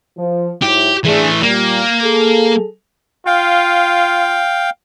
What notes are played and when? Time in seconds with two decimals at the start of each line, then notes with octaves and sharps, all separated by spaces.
0.17 F3
0.62 G#2 F#3 E4 G4
1.04 E3 A3 D4 G#4
1.43 A#2 G3 A#3
2.02 G#4 A4
3.26 F4 F5 G5